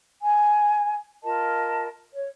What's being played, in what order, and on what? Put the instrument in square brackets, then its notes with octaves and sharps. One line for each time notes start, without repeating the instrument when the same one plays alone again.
[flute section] G#5
F4 A#4 D#5 A5
C#5